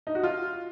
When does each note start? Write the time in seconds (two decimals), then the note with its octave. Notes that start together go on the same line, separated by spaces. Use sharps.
0.07 D#4
0.15 F#4
0.23 F4